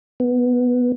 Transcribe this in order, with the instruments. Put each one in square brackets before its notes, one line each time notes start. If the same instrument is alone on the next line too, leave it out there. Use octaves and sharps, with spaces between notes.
[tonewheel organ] B3